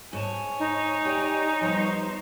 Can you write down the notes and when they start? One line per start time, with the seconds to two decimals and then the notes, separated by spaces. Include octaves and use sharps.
0.13 G#2 C#5 G#5 A5
0.59 D#4
1.05 G4 D5
1.61 F3 G3 B3 C5 C#5